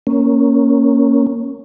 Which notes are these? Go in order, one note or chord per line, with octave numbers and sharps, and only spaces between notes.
A#3 C#4